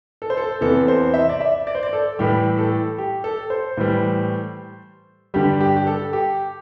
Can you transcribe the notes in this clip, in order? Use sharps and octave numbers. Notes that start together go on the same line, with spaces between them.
A4
C5
A4
E2 C3 E3 A4
C5
E5
D5
E5
D5
C5
D5
A4
A2 E3 G3 G4
A4
G4
A4
C5
A2 E3 G3
G2 D3 G3 G4
G4
G4
A4
G4